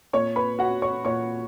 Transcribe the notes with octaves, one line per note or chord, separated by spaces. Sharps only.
A#2 C#5 C#6
B4 B5
F#4 F#5
C#5 C#6
A#2 C#5 C#6